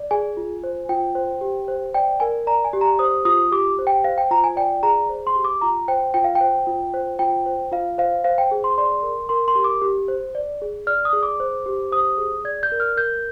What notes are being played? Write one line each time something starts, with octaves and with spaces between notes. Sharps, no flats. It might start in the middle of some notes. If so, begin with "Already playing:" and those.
Already playing: D5
G#4 G#5
F4
C5
F4 G5
C5
G4
C5
D5 G5
A#4 G#5
D5 A#5
G#5
G4
A#5
C5 D#6
F4 D#6
G4 D6
C5
G5
C5 F5
G5
F4 A#5
G#5
D5 G5
G#4 A#5
C5
C6
G4
D6
F4 A#5
C5 G5
F4 G5
F5
G5
C5
F4
C5
F4 G5
C5
F4 F5
C5 F5
C5 F5
G5
G#4
C6
D5 C6
A#4
A#4 C6
C6
G4
D6
G4
C5
D5
G#4
D5 F6
D#6
G#4
D6
C5
G4
C5 D#6
G#4
D5 G#6
G6
A#4
F6
A#4 G6